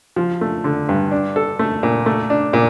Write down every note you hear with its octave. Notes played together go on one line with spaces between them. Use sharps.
F3
A3
D3
G2
D4
A4
A3
A#2
A3
D4
A#2